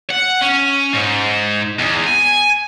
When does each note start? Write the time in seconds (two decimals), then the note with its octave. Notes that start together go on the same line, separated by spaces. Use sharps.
0.11 F#5
0.42 C#4
0.93 G#2
1.79 E2
2.07 G#5